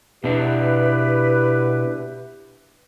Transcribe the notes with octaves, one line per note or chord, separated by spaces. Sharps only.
B2 D4 E4 G4 B4